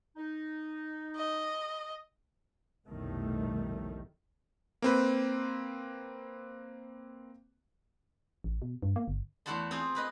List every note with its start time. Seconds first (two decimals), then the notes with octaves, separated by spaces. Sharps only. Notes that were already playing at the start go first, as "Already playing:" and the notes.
0.16 D#4
1.16 D#5
2.89 F1 B1 A2 D#3 G3 A3
4.82 A#3 C4 B4
8.44 A1
8.62 B2
8.83 G2
8.96 A#3
9.08 G1
9.46 E2 A3 E4 F#4 A5 C6
9.71 C4 F4 G#4 C5
9.95 A#3 B4 D#5